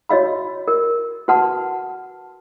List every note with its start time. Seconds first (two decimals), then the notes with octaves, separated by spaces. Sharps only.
0.09 F#4 C#5 D#5 F5 B5
0.68 A#4
1.28 F#4 B4 F#5 A5 C6